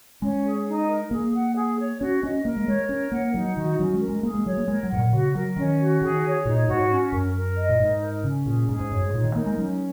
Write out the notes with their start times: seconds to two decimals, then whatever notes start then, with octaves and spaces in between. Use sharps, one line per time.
0.22 G#3 C#4
0.45 G#4
0.67 D#4
0.89 A#4
1.11 A#3 G#4
1.33 F#5
1.55 G#4
1.78 C#5
2.01 C#4 F#4
2.22 C#4 D#5
2.45 A#3 A#4
2.57 G#3
2.67 G#3 C#5
2.89 C#4 A#4
3.12 A#3 F#5
3.34 F#3 D#4
3.56 D#3 F#4
3.79 F#3 C#4
3.94 G#3
4.00 A#4
4.08 G#3
4.23 A#3 G#4
4.34 G#3
4.45 F#3 C#5
4.57 A#3
4.68 G#3 A#4
4.83 F#3
4.90 G#2 F#5
4.98 A#2
5.12 C#3 F#4
5.35 F#3 A#4
5.56 D#3 C#4
5.80 F#4
6.01 D#3 G#4
6.24 C#5
6.45 A#2 D#4
6.69 G#2 F#4
6.91 C#4
7.12 F#2 A#4
7.35 A#4
7.57 D#5
7.69 A#2
7.80 G#2 D#4
8.02 A#4
8.24 C#3 C#4
8.46 A#2 G#4
8.69 G#2 G#4
8.79 G#2
8.91 F#2 C#5
9.01 G#2
9.14 A#2 D#4
9.24 D#3
9.35 A#3 A#4
9.46 G#3
9.57 F#3 C#4